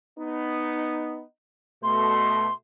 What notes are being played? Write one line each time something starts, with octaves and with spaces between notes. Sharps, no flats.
B3 D#4
B2 A3 C6